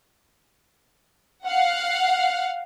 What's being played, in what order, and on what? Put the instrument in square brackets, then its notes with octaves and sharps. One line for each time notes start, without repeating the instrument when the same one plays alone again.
[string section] F5 F#5